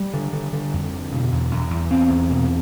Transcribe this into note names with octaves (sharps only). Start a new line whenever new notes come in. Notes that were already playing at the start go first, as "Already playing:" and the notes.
Already playing: G3
D3
D3
D3
F2
D3
B2
E2
E2
E2
E2 C4
E2
B2